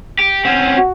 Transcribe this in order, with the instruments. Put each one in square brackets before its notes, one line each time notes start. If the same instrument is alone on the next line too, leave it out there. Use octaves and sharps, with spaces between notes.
[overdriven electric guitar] G4
[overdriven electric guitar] C4 C#4 [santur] F#5
[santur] F#4